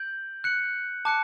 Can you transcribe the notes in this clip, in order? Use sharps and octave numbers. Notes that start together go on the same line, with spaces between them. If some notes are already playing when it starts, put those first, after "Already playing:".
Already playing: G6 D7 F#7
F#6 C#7 F#7
A5 D6 F#6 C#7